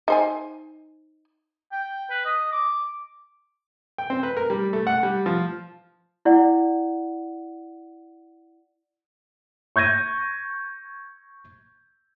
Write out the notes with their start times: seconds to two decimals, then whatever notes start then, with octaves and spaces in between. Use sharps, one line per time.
0.08 D#4 C5 G#5
1.72 G5
2.10 B4
2.25 D#5
2.52 D6
3.98 G5
4.10 C4
4.23 B4
4.37 A#4
4.50 G3
4.73 A3
4.87 F#5
5.03 G3
5.26 F3
6.25 E4 D5 F#5
9.76 C#6 G6 G#6 A#6 D#7